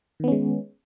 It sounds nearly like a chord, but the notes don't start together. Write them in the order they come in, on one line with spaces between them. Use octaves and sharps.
D#3 B3 C#4 G#3